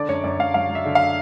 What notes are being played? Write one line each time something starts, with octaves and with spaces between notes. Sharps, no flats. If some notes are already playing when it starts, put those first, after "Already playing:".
Already playing: D3 D5
F#2 C#5
F#2 D5
F#2 F5
F#3 F5
F#3
E5
D3
F5